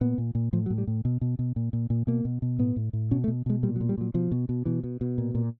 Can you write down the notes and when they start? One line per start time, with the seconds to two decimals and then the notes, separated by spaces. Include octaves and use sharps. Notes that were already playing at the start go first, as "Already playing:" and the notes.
0.01 A#2 B3
0.18 A#2
0.35 A#2
0.53 A2 F3
0.66 F#3
0.70 A2
0.78 G3
0.87 A2
1.05 B2
1.21 B2
1.39 B2
1.56 A#2
1.73 A#2
1.90 A#2
2.07 B2 A#3
2.25 B2
2.42 B2
2.59 A2 B3
2.76 A2
2.93 A2
3.11 B2 C#4
3.24 A3
3.28 B2
3.46 B2 G#3
3.63 A#2 G3
3.76 F#3
3.81 A#2
3.89 G3
3.98 A#2 F#3
4.14 B2 F3
4.32 B2
4.49 B2
4.65 B2 E3
4.84 B2
5.01 B2
5.18 A#2
5.35 A#2